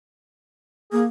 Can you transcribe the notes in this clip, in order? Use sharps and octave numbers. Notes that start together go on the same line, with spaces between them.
A#3 G#4